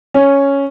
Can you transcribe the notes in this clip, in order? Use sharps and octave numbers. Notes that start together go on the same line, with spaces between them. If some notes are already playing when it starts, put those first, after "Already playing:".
C#4